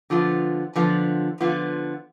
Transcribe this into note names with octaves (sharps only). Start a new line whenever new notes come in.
D3 F3 B3 F4
D3 F3 B3 F4
D3 F3 B3 F4